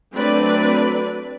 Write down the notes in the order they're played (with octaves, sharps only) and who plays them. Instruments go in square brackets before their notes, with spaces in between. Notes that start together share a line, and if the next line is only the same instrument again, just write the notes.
[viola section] F#3 A3 C4 D4 B4 D5